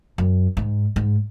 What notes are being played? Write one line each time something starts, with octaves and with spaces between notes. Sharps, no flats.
F#2
G#2
G#2